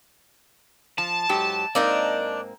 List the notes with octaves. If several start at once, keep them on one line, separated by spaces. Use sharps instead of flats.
F3 A5
G#2 F#3 G4
G#2 A#3 C4 D4 D#4 A#4